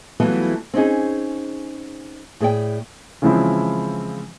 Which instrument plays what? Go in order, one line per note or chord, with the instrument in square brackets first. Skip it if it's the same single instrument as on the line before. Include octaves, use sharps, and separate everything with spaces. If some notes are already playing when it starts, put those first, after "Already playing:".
[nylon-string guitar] E3 F#3 G3 A3 B3 F4
C4 C#4 D#4 G#4
A2 G#4 D5 G5
[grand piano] C#3 E3 F3 G#3 C4 E4